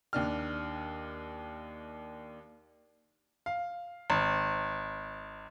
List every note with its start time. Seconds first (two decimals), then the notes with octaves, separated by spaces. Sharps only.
0.13 D#2 D4 F6
3.46 F5
4.10 G#1